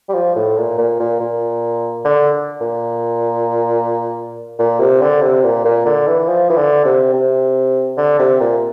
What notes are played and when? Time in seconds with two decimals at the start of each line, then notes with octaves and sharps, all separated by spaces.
0.09 G3
0.14 F3
0.36 A2
0.57 A#2
0.78 A#2
1.00 A#2
1.20 A#2
2.05 D3
2.61 A#2
4.59 A#2
4.80 C3
5.02 D3
5.22 C3
5.44 A#2
5.65 A#2
5.86 D3
6.07 E3
6.29 F3
6.50 E3
6.56 D3
6.85 C3
7.14 C3
7.97 D3
8.19 C3
8.40 A#2